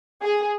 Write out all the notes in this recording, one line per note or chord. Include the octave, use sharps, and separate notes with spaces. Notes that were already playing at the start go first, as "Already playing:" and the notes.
G#4